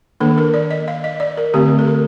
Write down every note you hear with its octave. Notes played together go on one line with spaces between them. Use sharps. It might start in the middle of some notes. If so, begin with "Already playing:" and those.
D#3 A#3 D4 A4
A#4
D5
D#5
F5
D#5
D5
A#4
D3 A3 C4 G4
A4
A#4